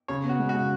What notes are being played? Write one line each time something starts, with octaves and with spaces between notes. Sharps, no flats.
C#3 C#5
B3
F#4
G#3
F#4
C#3